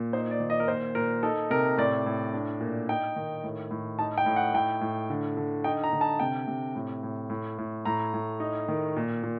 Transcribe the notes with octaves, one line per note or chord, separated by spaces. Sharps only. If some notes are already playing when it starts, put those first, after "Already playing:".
Already playing: A#2
D#4 C5
D5
D#3
D#5
A#4
A#2 C5
A#2 A#4
D#4 A4
C3 A#4
A2 D5
A2
D4
A#2
D#4 G5
D#3
A2
A2
D#4 A5
G5
A2
F#5
A2 G5
A2
D3
D3
D#4 G5
A#5
D3
A5
C3 G5
C3
A2
A2
A2
A2
A2 A#5
A2
D#4
D#3
A#2
A#2